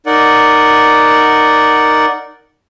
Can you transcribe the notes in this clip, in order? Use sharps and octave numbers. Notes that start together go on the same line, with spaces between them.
D#4 A#4 D5 F#5